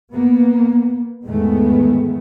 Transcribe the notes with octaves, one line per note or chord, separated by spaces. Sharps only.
A#3 B3
E2 G#2 D#3 G#3 A3 B3